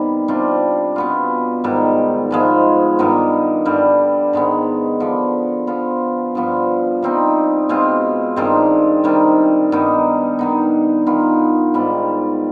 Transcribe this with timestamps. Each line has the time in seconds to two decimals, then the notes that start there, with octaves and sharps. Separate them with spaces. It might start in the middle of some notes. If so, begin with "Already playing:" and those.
Already playing: C3 D#3 G3 B3
0.28 C3 G3 D4 F4
0.96 B2 B3 F4
1.64 G#2 D#3 G3
2.31 G#2 F3 G#3 B3
2.99 G2 D#3 B3 D#4
3.65 G2 D3 G3
4.33 G#2 D#3 G#3 B3
5.00 D3 F3 B3
5.67 F3 B3 F4
6.35 G2 F3 B3
7.02 C3 G3 C4 D#4
7.69 B2 G#3 C4 F4
8.36 G2 D#3 G#3 C4
9.04 C3 D#3 G3
9.72 G2 D#3 B3 D#4
10.39 D#3 B3 D#4
11.07 D#3 B3 F4
11.74 G#2 G3 B3